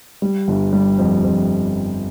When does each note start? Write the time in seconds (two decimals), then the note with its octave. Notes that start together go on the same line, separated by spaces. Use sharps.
0.22 G3
0.48 G1
0.73 G3
0.99 F2
1.24 F2